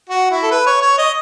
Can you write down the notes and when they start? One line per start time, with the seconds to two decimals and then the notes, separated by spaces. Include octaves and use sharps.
0.09 F#4
0.31 E4
0.43 A4
0.51 B4
0.67 C#5
0.82 C#5
0.99 D#5